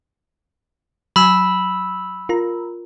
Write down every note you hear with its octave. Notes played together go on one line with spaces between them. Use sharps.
F#3 G#5 B5 E6
F4 A#4 A#5